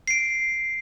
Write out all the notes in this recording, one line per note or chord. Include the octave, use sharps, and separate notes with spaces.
C7 D7